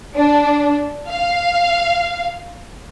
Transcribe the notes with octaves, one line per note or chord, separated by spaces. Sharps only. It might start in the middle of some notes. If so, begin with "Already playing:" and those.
D4
F5